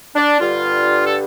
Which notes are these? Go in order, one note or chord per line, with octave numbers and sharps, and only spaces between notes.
D4
G2 D3 G3 F4
A4